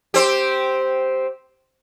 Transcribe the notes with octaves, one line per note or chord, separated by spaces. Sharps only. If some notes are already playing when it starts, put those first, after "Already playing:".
C4 G4